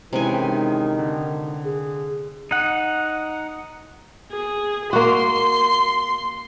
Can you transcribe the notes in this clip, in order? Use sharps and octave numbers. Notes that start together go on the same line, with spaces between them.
C3 D#3 E3 G#3 C#4 G#5
D3
G#4
D#4 F#5
G#4
A#3 F#4 C6